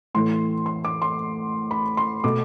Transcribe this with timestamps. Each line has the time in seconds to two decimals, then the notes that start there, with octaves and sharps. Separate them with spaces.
0.14 A2 E3 A3 C6
0.66 C6
0.85 D6
1.02 C6
1.71 B5
1.97 C6
2.24 B2 A3 D6